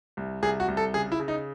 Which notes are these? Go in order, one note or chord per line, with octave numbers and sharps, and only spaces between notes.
C2
C2 G#4
F#4
C2
A4
C#3 G#4
E4
C#3
D#4